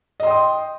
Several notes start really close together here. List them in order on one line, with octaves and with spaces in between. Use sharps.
D#5 C6 G5 D#6